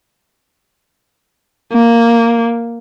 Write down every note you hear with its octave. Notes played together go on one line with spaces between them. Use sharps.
A#3